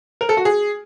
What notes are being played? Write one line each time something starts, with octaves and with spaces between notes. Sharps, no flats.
A#4
A4
F#4
G#4